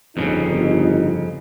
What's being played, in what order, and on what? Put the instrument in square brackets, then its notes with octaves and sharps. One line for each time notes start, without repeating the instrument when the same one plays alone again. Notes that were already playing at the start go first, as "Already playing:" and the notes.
[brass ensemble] G1 D#4 [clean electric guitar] F2 A#2 C#3